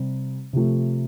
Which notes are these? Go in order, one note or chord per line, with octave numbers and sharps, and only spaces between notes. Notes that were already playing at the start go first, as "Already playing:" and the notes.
Already playing: C3 G3 C4
C3 F3 A3